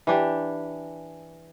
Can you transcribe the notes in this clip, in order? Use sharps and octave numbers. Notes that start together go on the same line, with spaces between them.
E3 D4 G4